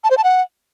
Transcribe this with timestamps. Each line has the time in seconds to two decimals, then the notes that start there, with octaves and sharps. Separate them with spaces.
0.04 A5
0.11 C5
0.17 A5
0.24 F#5